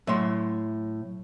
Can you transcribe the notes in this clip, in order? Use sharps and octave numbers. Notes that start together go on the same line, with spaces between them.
A2 F#3 E5 C6